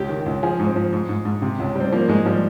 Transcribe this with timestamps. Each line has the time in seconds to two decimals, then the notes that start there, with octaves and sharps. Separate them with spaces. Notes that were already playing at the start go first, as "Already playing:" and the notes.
Already playing: C#2 G4
0.09 D#3
0.26 C#2
0.43 F3 G#4
0.60 G#2
0.67 C4
0.76 F3
0.93 G#2
1.09 G#2
1.25 G#2
1.42 C3
1.60 C#2
1.75 G3 C4
1.92 F3 A#3
2.08 G#2 G#3
2.26 F3 G3